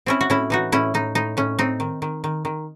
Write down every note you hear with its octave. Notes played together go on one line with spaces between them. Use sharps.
C4 C#4 E4
F#4
A2 C#4 E4
E3 D#4 F#4
A2 C#4 E4
A2 D#4
A2 D#4
A2 C#4
C4 D#4
D#3
D#3
D#3
D#3